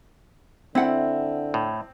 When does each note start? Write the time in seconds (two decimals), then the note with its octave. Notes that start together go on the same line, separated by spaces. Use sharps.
0.75 D3 C4 E4 F#5
1.54 A2